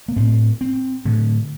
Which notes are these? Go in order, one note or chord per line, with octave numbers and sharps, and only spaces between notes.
A#3
A2 C4
C4
A2 D3